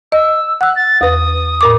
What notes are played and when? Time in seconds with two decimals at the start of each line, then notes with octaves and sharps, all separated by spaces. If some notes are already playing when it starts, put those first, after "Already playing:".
0.12 D#5 E6
0.61 F#5 E6 F#6
0.76 A6
1.01 E2 B4 D#6
1.61 A2 A#4 D6